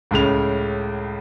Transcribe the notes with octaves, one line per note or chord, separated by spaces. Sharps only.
C#2 A2 C#3 F7